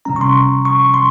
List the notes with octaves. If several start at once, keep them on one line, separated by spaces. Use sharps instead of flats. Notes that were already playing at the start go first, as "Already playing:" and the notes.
C3 G3 C#4 A#5
C#6
C6
C#6
C6